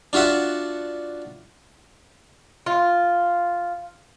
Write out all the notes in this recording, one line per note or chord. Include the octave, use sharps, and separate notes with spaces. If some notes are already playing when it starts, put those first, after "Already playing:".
D4 F4 F#4 E5 F#5
F4